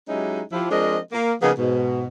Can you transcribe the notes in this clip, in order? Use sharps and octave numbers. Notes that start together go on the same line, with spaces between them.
F#3 G#3 C#4 D#4 E4 G4
F3 E4 G4
F3 G#3 C4 D4 A#4 D#5
A#3
C#3 F3 A#3 B3 D#4 G#4
G#2 B2